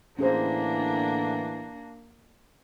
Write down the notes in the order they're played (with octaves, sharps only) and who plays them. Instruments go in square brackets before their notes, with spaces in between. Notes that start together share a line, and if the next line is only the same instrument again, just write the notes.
[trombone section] A2 D3 E3 [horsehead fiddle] A#3 D4 [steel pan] C#4 G#4 C5